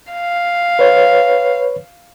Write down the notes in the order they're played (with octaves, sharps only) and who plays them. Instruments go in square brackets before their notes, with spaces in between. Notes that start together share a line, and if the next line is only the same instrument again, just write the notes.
[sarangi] F5
[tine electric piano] B4 C#5